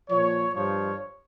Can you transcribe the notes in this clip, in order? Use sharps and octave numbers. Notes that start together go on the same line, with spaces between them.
A#2 F3 C#5
G2 F3 C#5